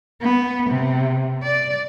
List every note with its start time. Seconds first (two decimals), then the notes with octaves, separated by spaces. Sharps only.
0.22 B3
0.70 C3
1.43 D5